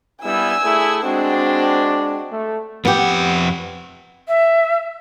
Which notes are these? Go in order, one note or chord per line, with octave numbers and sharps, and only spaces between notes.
G3 B3 E4 G#5 E6
A3 E4 G#4
G#3 C4 D4 F#4
A3
F2 B3 G4 F#5
E5